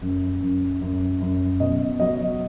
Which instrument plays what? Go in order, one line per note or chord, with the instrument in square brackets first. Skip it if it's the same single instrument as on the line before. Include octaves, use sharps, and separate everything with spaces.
[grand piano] F#2
F#2
F#2
F#2
B2 D#5
F#3 D#5